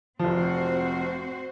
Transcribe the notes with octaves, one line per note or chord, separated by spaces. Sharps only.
F1 F3 C4 F#4 C5